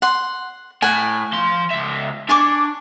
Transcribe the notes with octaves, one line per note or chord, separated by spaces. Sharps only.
F#5 C6
A2 F#5 G#5
F3 C6
C#2 E5
D4 G#5 C#6 D6